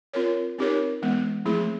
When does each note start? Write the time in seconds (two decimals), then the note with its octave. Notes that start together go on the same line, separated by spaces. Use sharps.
0.13 C4 F4 A#4 C#5
0.58 C4 D#4 G4 A#4 C#5
1.02 E3 G#3 B3
1.46 F3 A3 C4 E4 G#4